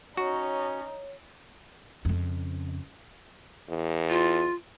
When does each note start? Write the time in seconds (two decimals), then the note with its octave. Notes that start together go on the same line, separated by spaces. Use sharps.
0.17 C#4 D#4 F#4 C#5
2.05 F2 C#3
3.69 E2
4.10 F4